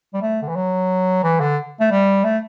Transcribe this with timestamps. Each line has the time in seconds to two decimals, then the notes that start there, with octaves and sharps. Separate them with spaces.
0.14 G3
0.22 A3
0.42 D3
0.48 E3
0.55 F#3
1.24 E3
1.40 D3
1.80 A3
1.91 G3
2.25 A3